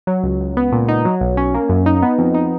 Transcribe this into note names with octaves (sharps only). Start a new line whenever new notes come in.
F#3
C#2
C#2
B3
A#2
D#4
F#3
B1
C#4
A#3
F#2
D#4
B3
F2
D#4